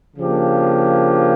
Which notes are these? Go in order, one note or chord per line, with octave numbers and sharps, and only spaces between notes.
C#3 F3 A#3 D4 G4